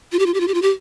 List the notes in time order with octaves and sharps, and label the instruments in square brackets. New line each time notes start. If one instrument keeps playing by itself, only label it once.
[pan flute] F4
G4
F4
G4
F4
G4
F4
G4